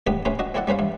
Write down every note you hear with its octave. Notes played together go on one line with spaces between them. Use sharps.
E2 A2 B3 D4 G4 B4
A2 C3 C#4 B4 C5 G5
D4 F#4 D#5
C4 E4 A4 D5 F#5
G3 C#4 B4 C5 F5
G2 E3